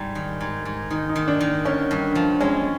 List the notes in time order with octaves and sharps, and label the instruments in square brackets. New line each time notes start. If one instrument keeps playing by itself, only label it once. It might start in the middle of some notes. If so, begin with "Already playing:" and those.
Already playing: [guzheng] G#2 G3
D#3
G#2
G#2
[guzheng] D#3 [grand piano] D#4
[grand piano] D#4
[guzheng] D#3
[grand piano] D4
[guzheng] D#3
[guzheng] D3 [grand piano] C#4
[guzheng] G2
F3
[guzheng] G#3 [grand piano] C#4